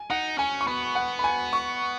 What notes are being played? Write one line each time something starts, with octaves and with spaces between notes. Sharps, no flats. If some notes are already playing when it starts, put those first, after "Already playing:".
Already playing: G#5
D#4 F#5
C#4 G#5
C#6
B3 B5
F#5
B5
G#5
C#6